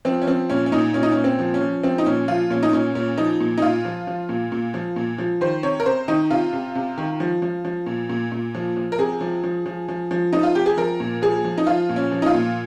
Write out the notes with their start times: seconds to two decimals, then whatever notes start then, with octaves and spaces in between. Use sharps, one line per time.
0.05 F3 C4
0.22 C#4
0.27 F3 C4
0.50 A#2 C#4
0.66 C#4
0.72 A#2 D#4
0.94 A#2 C#4
1.03 D#4
1.12 C#4
1.17 A#2
1.24 C4
1.39 F3
1.54 C#4
1.61 F3
1.83 F3 C4
1.98 D#4
2.06 A#2 C#4
2.28 F3 F4
2.50 A#2 C#4
2.63 D#4
2.73 A#2 C#4
2.95 A#2 C#4
3.18 F3 D#4
3.40 A#2
3.58 D#4
3.62 A#2 F4
3.85 F3
4.07 F3
4.29 A#2
4.52 A#2
4.74 F3
4.96 A#2
5.18 F3
5.41 D#3 C5
5.63 C3 C#5
5.80 A#4
5.86 C3 C5
6.08 D#3 D#4
6.31 C3 F4
6.53 C3
6.75 C3
6.98 D#3
7.20 F3
7.42 F3
7.65 F3
7.86 A#2
8.09 A#2
8.32 A#2
8.55 F3
8.76 F3
8.92 A#4
8.99 C3 G#4
9.21 F3
9.44 F3
9.66 F3
9.89 F3
10.11 F3
10.33 F3 D#4
10.43 F4
10.55 C3 G4
10.66 G#4
10.77 F3 A#4
11.00 A#2
11.22 F3 G#4
11.45 F3
11.58 D#4
11.67 F3 F4
11.89 A#2
11.96 C#4
12.11 F3
12.22 D#4
12.26 F4
12.34 A#2